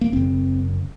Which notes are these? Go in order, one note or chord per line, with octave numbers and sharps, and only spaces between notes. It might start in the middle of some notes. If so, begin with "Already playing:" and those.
A#3
F#1 F#2 C#3 C4